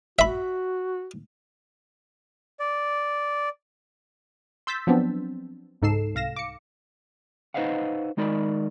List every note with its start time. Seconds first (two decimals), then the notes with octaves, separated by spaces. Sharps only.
0.19 F#4 E5 B5
2.60 D5
4.67 C6 E6 G6 A6 B6
4.87 F3 F#3 B3 C4 D4
5.82 C#2 G#2 D#4 A4 C7 E7
6.15 C2 F5 A#6 E7
6.36 D6 C#7
7.54 D#4 B4 C5 D#5 F5 F#5
8.17 D#3 G#3 D#4 A#4 D5 B5